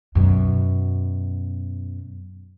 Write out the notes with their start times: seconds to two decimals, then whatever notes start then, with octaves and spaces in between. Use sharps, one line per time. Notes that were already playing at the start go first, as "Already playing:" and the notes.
0.15 F#2 B2